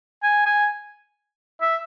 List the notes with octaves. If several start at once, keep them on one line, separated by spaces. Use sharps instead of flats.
G#5
G#5
E5